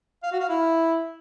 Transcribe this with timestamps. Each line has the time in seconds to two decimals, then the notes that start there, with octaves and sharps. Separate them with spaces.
0.23 F5
0.32 F#4
0.40 F5
0.49 E4